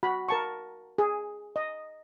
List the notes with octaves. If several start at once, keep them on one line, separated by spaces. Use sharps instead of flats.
F#4 B5
A#4 A5 C#6
G#4
D#5